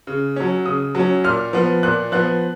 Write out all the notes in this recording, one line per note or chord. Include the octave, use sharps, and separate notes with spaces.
C#3
F#3 C#4
C#3 D#6
F#3 C#4
A#2 F6
F3 B3
A#2 F#6
F3 B3 F#6